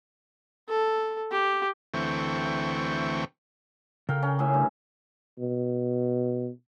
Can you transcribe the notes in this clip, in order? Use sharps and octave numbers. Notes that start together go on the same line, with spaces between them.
A4
G4
D2 E3 A3 C4 G5 C#6
C#3 A4 A#4 F5 G5
C#4
A2 G#4 E5
G2
B2